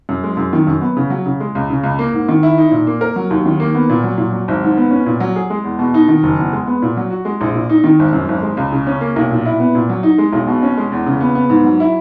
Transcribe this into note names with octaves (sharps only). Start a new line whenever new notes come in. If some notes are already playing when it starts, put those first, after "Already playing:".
F#2
G#3
F#2
D#3
F#2
B3
C#3
F#3
C#3
G#3
C#2
C#3
C#2
A#3
G#2
D#3
E4
D#4
A#2
A#3
A#4
F#3
D#2
D#3
A#3
B3
A#2
F#3
A#2
F#3
G#1
G#2
B3
C#4
A#2
F#3
G#4
G#3
E2
B2
D#4
D#3
F#1
E2
G#3
B3
A#2
F#3
F#4
G#3
A#1
A#2
D#4
D#3
G#1
F#2
G#1
G#3
C#2
C#3
C#4
A#3
B1
A#2
E4
B3
A#2
F#3
D#4
G#3
B1
B2
C#4
G#3
E2
C#3
B3
B3
G#2
F#3
E4